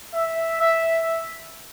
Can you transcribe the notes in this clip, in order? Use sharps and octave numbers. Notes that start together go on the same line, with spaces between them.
E5
E5